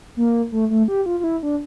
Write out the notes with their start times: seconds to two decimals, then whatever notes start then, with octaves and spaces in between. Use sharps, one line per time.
0.17 A#3
0.52 A3
0.70 A3
0.88 G4
1.06 F4
1.20 F4
1.24 E4
1.43 D4